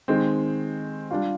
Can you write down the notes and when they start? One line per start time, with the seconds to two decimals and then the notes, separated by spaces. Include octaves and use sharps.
0.08 D#3 G#3 C4
1.11 G3 D4 F4